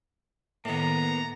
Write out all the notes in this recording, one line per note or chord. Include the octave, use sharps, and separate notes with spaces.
A2 D#3 A#3 B3 A#5